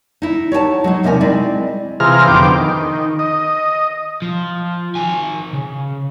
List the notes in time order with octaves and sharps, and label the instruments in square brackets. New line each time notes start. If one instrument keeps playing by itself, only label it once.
[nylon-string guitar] D#4 E4
C#5 F#5 G5 A5
F#3 G#3 D#4
E2 C3 A#3 D#4 D#5 G#5
G#3 C4 E4 D5
[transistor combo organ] C3 E3 F4 G#4 A#5 F6
F2 D3 B3 C5 G5 D6
D#3
D#5
[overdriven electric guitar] F3
D#3 G#5
C#3